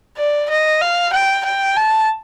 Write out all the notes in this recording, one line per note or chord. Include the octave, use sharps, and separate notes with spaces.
D5
D#5
F5
G5
G5
A5